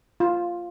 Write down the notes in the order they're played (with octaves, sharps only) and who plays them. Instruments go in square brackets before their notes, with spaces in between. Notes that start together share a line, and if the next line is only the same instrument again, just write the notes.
[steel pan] F4